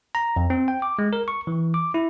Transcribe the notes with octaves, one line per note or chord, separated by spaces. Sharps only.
A#5
F2
C4
G5
D6
G#3
A#4
C#6
E3
D6
E4